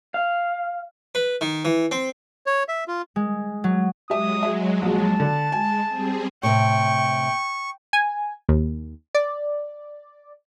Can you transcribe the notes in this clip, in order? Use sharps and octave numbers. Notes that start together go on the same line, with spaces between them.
F5
B4
D#3
E3
C4
C#5
E5
F4
G#3
F#3
F#3 G#3 G4 E5 D#6
E5
A#1 A5
D3
G#3 G#5
G3 C4 G#4
A2 C3 G5 C#6
G#5
D#2
D5